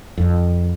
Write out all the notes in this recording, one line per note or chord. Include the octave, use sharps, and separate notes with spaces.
F2